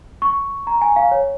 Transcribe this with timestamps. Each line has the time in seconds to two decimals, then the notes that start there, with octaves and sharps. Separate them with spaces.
0.22 C#6
0.67 A#5
0.81 G#5
0.96 F5
1.12 C#5